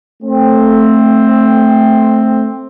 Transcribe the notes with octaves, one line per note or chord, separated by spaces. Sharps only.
A3 C4